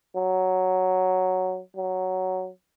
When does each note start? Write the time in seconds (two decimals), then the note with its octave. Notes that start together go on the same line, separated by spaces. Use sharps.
0.15 F#3
1.76 F#3